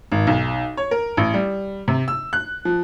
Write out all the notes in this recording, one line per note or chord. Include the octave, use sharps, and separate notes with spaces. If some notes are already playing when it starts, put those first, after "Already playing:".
G#1
B1
C#5
A#4
A1
G3
C3
E6
F#6
F3